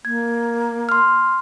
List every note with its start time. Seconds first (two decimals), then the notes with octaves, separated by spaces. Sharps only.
0.05 A#3 G#6
0.89 C6 F6